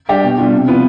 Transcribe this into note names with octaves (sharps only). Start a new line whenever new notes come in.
G3 D4 G4
B2
G3 D4 F4
C3
F3 B3 F4